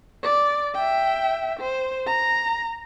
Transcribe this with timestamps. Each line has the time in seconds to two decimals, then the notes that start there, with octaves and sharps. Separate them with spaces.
0.23 D5
0.74 E5 G5
1.60 C5
2.06 A#5